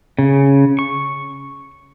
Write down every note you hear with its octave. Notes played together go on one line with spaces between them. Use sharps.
C#3
C#6